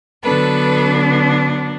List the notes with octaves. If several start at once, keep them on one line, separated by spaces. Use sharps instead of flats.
D3 F#3 B3 D4 A4 B4